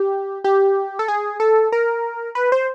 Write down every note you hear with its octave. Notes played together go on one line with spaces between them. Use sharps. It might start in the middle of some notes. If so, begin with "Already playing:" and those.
Already playing: G4
G4
A4
G#4
A4
A#4
B4
C5